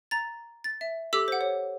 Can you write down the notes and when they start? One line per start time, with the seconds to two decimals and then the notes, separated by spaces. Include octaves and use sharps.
0.11 A#5 A6
0.64 A6
0.81 E5
1.13 G4 A4 D6 E6 B6
1.28 C5 F#5
1.41 C#5